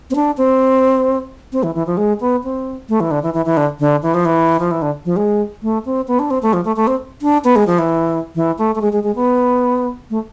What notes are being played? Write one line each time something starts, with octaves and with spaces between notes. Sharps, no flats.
C4
D4
C4
C4
E3
E3
F3
G#3
B3
C4
A3
E3
D3
E3
E3
E3
D3
D3
E3
F3
E3
F3
E3
D3
F3
G#3
A3
C4
B3
D4
C4
A3
F3
A3
A3
C4
D4
B3
G#3
F3
E3
E3
A3
A3
G#3
G#3
G#3
B3
A3